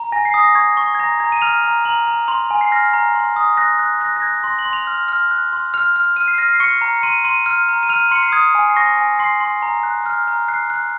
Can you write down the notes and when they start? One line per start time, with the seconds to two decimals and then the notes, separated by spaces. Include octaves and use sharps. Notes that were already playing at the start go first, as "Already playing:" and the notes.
Already playing: A#5
0.12 G#5 A#6
0.25 C7
0.34 D#6
0.40 A#6
0.55 C#6 G#6
0.77 C#6
0.95 G#6
1.00 A#5 A#6
1.20 A#5 G#6
1.32 D#7
1.42 F6 F7
1.64 A#5
1.85 A#5 F#7
2.07 A#5
2.28 C6 F7
2.51 G#5
2.61 C7
2.72 F6 A#6
2.94 A#5
3.15 C6
3.36 D#6
3.57 F#6 A#6
3.79 F#6
4.01 F#6 A#6
4.16 A#6
4.22 F#6 G#6
4.44 C6 A#6
4.59 F#7
4.65 C6
4.73 F7
4.87 F6
5.08 F6
5.31 F#6
5.53 C6
5.74 F6 F7
5.96 F6
6.16 F6 D#7
6.28 C7
6.38 F6 A#6
6.49 C7
6.60 C#6 C#7
6.81 A#5
6.97 C#7
7.03 C6 D#7
7.24 C6 D#7
7.46 F6
7.69 A#5
7.83 D#7
7.89 F6 F7
8.00 D#7
8.11 C6 C#7
8.23 C7
8.32 D#6 G#6
8.55 G#5
8.70 C7
8.76 C#6 A#6
8.97 G#5
9.19 C6 C7
9.40 C6
9.62 A#5
9.83 F#6
10.06 F6
10.28 A#5
10.48 F#6 C7
10.70 F#6